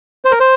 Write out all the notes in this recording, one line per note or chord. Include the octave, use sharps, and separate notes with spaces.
C5
A#4
C5